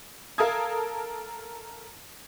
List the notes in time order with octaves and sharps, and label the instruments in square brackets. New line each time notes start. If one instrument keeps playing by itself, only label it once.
[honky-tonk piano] A4 A#4 F5 A5 D#6 G#6